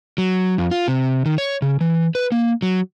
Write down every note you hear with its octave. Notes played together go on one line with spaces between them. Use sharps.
F#3
F2
F4
C3
D#3
C#5
C#3
E3
B4
A#3
F#3